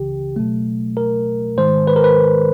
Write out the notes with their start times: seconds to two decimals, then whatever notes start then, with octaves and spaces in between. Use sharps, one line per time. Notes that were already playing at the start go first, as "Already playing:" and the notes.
Already playing: C#2 C#3 E3 G4
0.36 B2 F#3 A3
0.97 A#4
1.57 G#2 D#3 G#3 C5
1.87 B4
1.96 A#4
2.04 B4